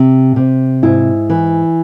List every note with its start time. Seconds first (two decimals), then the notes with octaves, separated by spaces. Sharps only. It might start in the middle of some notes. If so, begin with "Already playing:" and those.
Already playing: C3
0.36 C3
0.83 G#2 E4
1.30 E3